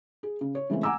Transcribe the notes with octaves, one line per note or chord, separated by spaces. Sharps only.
G#4
C#3
C#5
C#3 E3 G#3 A3 C4 C#4
F#5 G#5 A#5 D6 E6